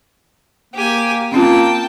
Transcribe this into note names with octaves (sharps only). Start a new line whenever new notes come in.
A#3 G4 G#5
A#3 C4 C#4 F4 G5 A5